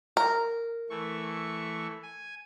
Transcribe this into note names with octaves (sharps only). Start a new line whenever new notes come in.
A#4
E3 A3 C#6
G#5